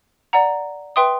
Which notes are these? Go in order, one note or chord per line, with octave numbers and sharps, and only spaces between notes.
D5 F#5 A#5
B4 E5 G5 C6 D#6